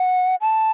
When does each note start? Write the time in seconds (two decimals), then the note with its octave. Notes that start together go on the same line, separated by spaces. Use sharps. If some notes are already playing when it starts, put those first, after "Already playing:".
Already playing: F#5
0.41 A5